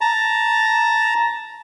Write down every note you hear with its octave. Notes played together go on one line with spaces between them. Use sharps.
A5 A#5